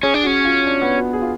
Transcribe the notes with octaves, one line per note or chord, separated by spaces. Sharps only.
C#4 G#4
D4
C#4 F#4
F4
D4
B3
F#4
G#4
F4